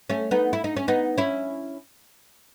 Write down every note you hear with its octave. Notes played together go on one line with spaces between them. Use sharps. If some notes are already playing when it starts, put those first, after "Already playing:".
A3 C#4
B3 D#4
E4
D#4
C#4
B3 D#4
C#4 E4